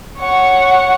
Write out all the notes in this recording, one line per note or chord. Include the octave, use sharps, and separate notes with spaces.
C#5 F#5